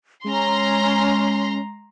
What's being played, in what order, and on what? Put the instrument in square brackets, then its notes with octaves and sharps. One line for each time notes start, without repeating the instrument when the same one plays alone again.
[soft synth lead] G#3 [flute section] C#4 [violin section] A#5 C6